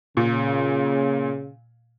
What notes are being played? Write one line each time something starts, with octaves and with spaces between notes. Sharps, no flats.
A#2 C#3